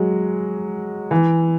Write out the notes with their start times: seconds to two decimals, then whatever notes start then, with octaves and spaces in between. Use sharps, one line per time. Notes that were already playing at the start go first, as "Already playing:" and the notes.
Already playing: F#3 G#3
1.11 E3